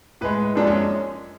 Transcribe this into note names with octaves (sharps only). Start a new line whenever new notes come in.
A2 G#3 B4
F#2 F3 G#3 D4
C#4